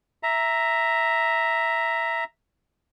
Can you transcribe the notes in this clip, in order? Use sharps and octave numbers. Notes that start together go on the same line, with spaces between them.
E5 A#5